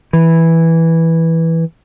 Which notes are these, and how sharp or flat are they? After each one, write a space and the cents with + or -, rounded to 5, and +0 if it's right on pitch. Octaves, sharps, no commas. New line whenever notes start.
E3 -5